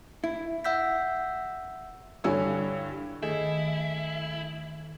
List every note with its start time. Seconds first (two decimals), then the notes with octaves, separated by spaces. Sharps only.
0.24 E4
0.64 E5 F#5 E6 G6 B6
2.24 G2 D3 E4 C#5 G#5 E6
3.23 D#3 A3 E4 G#4